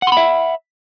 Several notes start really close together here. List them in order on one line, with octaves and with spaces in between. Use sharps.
F#5 C6 B5 E5